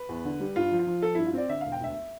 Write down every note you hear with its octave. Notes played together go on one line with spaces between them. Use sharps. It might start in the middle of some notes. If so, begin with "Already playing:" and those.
Already playing: B4
E2
D3
G3
G2 F4
F3
F4
F3
F3 A4
G2 E4
F4
C4 D5
D3 E5
E1 F5
G5
D2 E5